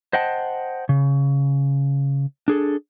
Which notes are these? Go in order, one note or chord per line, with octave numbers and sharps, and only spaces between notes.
C5 D#5 F#5 G5 A5
C#3
D4 G#4 A4